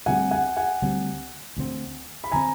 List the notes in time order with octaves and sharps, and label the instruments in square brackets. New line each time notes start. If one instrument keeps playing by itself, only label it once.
[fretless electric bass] D2 D3 G3 C4 [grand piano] F#5 G#5
[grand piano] F#5 G#5
F#5 G#5
[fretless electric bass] D2 D3 G3 C4
D2 D3 G3 C4
[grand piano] B5
[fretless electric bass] D3 G3 C4 [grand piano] G#5 A#5